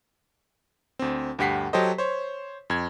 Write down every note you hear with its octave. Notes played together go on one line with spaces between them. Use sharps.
D2 C4
D2 G2 G4 F#5 B6 C7
F#3 G4 A4 C5 D#5
C5 C#5
F2 G#6